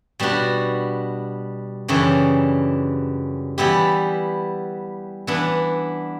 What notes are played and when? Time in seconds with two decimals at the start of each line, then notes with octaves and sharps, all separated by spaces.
0.19 B2 G3 D4 F#4
1.88 F#2 C#3 E3 G3 D4
3.58 E3 G3 B3 E4 G4
5.27 E3 B3 D4